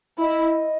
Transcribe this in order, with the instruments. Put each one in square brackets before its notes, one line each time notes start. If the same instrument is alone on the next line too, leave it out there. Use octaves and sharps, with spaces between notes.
[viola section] E4 [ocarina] D#5